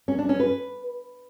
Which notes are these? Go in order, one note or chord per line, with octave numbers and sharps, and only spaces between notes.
C#4
D4
C#4
B4